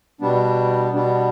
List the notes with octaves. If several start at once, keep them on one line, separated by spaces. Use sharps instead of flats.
B2 G3 B3 D4
B2 G3 B3 D4